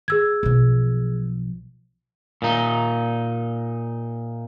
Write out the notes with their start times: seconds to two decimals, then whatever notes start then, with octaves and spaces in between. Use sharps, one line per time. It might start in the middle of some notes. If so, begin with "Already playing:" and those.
0.08 G#4 E6 G#6
0.43 B1 F3
2.42 A#2 D#4